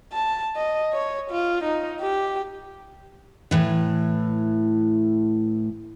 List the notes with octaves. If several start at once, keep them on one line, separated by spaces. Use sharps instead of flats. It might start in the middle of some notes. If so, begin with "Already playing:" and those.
A5
D#5
C#5
F4
D#4
G4
A2 E3